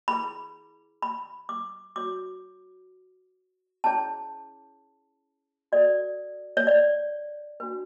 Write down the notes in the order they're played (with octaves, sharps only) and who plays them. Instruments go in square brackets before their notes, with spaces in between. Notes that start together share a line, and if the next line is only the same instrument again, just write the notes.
[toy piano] E4 G#4 B4 B5
B5
D6
F#4 C#5 D6
C#4 E4 G#4 C#5 A5
F#4 A4 C#5 D5
C#5
D5
D4 F#4 B4